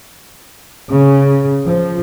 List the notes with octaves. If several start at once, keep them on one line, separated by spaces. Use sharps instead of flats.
C#3
F3